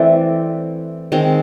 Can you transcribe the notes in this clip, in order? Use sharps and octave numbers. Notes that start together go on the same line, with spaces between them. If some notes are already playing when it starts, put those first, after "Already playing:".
Already playing: E3 A3 C4 D5 E5
D#3 G#3 C4